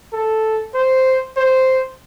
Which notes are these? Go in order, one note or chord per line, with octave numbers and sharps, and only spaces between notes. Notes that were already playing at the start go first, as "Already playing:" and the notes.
A4
C5
C5